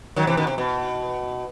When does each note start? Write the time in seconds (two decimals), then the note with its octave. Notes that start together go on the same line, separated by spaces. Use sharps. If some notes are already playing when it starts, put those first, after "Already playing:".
0.16 D#3 F#3
0.27 C3 E3
0.37 B2 D#3
0.47 C3
0.58 B2